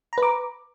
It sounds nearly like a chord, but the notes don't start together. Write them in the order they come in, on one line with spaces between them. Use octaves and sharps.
A#5 B4 D6